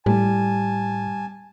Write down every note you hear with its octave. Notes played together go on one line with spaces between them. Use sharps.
A2 G3 G#5 A5